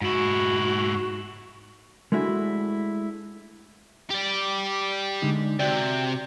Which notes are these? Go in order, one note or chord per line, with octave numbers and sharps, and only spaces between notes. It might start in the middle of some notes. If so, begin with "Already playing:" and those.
G#2 E4 F#4
G#3 A3 D4 E4 F#4
G4 D5
D3 G#3 D#4
C3 F#4 D5 G5